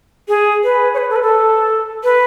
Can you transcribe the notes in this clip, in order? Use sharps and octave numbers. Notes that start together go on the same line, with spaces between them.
G#4
B4
C#5
B4
A4
B4
A4
B4